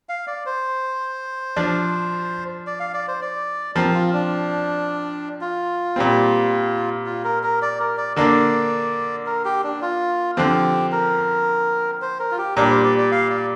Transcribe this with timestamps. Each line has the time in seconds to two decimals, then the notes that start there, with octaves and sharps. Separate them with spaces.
0.09 F5
0.27 D5
0.46 C5
1.56 F3 D4
2.67 D5
2.80 F5
2.94 D5
3.08 C5
3.22 D5
3.76 F3 C4 A#4
3.94 F4
4.13 D4
5.41 F4
5.96 A#2 G3 C4
7.06 F4
7.24 A#4
7.43 A#4
7.62 D5
7.80 A#4
7.98 D5
8.16 D3 A#3 D4 D5
9.26 A#4
9.45 G4
9.64 D4
9.82 F4
10.37 D3 F3 C4 G4
10.92 A#4
12.02 C5
12.19 A#4
12.31 F4
12.38 G4
12.56 A#2 G3 D4 A#4
12.71 C5
12.84 D5
12.98 D5
13.12 F5
13.30 D5